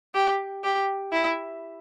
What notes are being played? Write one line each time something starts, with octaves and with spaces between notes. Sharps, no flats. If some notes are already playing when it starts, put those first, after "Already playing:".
G4
G4
E4